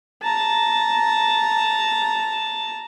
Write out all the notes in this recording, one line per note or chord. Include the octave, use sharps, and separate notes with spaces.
A5 A#5